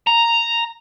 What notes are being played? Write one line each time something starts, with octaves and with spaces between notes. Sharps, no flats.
A#5